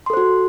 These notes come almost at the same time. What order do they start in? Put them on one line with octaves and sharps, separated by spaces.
C6 A4 C5 F#4